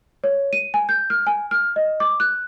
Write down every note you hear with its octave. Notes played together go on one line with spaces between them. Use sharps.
C#5
D#7
G#5
G6
F6
G#5
F6
D#5
D6
F#6